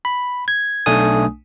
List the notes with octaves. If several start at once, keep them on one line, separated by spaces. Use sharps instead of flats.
B5
G#6
B1 A3 D4 G#5 D#6